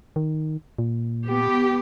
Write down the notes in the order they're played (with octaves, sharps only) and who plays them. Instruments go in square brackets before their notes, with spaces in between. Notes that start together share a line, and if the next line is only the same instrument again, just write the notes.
[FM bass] D#3
A#2
[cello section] B3 G4